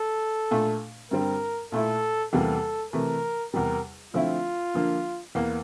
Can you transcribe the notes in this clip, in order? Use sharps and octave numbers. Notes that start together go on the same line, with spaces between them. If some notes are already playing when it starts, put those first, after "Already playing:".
Already playing: A4
A#2 A3 D4
G2 D3 G3 C4 A#4
A#2 A3 E4 A4
E2 C3 E3 G3 A#3 A4
C3 E3 A3 A#4
E2 C3 G3 A#4
D3 F3 A3 C4 E4 F4
D3 F3 A#3 D4
E2 E3 A#3